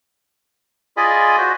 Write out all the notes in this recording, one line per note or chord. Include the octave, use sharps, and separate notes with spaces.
F4 G#4 D5 D#5 G#5 B5
F#4 C5